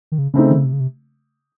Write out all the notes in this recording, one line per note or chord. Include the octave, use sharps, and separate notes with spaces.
D#3
C#3
C#3 A3 C4 D#4
D#3
C#3
C3
C#3
C3